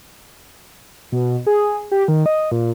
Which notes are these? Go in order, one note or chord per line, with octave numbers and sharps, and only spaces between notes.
B2
G#4
G4
D#3
D#5
A#2